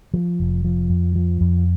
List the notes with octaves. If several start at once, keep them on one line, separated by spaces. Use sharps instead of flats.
F3
F1
F3
F2
F3
F2